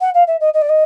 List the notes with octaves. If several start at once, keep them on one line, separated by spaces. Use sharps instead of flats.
F#5
F5
E5
D#5
D#5
D5
D#5